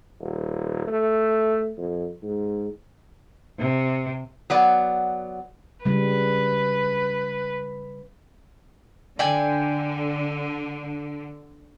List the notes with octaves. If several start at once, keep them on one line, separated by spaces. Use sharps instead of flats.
D#1
A3
F2
G#2
C3
F#3 B3 D5
C#3 G3 B4
D3 D5 G5 G#5